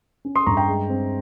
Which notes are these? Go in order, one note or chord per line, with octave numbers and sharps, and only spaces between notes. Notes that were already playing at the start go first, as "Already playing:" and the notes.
C#4
C6 D#6
G2 A#5 C#6
G5 A#5
G#3
C4